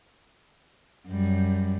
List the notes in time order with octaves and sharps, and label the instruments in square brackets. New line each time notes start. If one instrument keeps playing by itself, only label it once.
[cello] F#2 G3